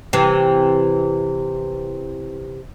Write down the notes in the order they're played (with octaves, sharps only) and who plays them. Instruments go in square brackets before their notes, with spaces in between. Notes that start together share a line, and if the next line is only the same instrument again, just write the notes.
[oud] C3 E3